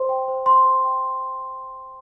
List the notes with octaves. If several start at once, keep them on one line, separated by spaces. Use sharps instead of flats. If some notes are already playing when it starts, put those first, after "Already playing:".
Already playing: C5 C6
G5
C5
C6
C5
G5